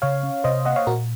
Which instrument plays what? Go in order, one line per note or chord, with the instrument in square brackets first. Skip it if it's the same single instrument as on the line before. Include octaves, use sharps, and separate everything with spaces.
[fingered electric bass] C#3 [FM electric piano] C#5 F5
[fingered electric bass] C#4
[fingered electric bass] C3 [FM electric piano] C5 D#5
[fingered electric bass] A#3 [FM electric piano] D#5 F#5
[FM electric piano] C#5 F5
[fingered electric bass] A#2 [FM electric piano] F#4 A#4